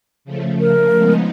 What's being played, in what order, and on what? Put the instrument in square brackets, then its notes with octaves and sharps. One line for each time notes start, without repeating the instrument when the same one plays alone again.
[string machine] C#3 F3 A3
[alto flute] A#4
[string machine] C#3 F3 G#3 B3 D#4